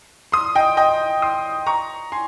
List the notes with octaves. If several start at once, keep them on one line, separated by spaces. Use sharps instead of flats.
C6 D#6
D#5 G5
D#5 G5
C6 D#6
A#5 C#6
G#5 C6